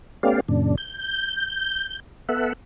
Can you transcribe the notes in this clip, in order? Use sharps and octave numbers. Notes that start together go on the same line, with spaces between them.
A3 B3 C#4 G4 D5 F5
F#2 A#2 C#3 D4
G6
B3 A4 E5 F#5